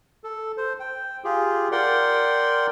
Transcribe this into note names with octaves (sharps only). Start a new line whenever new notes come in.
A4
C5
G5
F4 G4 G#4
A#4 D5 F#5 G5 C6